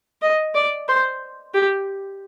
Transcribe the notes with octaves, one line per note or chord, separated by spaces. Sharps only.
D#5
D5
C5
G4